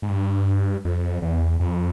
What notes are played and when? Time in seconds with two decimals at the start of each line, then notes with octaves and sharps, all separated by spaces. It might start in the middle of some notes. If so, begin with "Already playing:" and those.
0.02 G#2
0.09 G2
0.85 F2
1.22 E2
1.60 F2